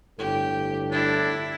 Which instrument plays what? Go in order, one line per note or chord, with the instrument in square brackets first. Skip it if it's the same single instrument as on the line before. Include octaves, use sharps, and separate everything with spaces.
[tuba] G1 [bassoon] A2 [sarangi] G4
[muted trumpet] D4 [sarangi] E4